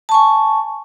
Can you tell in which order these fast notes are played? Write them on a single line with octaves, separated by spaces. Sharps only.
A5 C#6 G#5